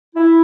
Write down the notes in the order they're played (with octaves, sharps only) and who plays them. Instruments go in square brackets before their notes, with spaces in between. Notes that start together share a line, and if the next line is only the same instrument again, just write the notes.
[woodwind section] E4